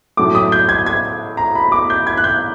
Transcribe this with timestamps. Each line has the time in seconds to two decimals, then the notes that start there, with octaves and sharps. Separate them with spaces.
0.17 A2 F#3 A3 D6
0.35 D#6
0.52 G6
0.69 G#6
0.86 G#6
1.37 A#5
1.55 B5
1.72 D6
1.90 G6
2.07 G#6
2.17 F#6
2.24 G6